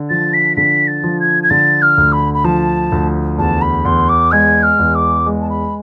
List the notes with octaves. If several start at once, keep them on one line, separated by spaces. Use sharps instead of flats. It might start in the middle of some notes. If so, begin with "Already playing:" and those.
Already playing: D3
F3 A6
B6
D3 B6
A6
F3
G#6
G#6
D3 A6
F6
D2
B5
B5
F3 A5
D2
E2 A5
B5
E2 C6
D6
G#3 G#6
F6
E2
D6
G#3
A5
B5